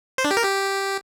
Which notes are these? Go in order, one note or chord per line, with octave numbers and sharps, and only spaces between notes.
C5
D4
G4
A#4
G4